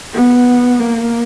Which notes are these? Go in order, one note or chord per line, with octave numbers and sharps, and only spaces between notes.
B3
A#3